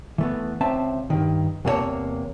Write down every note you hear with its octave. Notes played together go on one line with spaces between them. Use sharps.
E3 A3 B3
C#2 C4 E5 A5
G2 D#3
E2 C3 A#3 F#4 C#5 A5